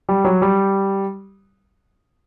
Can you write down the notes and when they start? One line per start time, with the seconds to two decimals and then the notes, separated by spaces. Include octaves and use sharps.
0.09 G3
0.25 F#3
0.42 G3